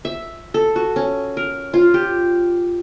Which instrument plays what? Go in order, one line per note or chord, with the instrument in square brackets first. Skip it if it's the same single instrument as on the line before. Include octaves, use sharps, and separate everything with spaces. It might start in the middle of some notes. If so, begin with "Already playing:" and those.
[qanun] E5
A4
F#4
C#4
A#4
F4
G4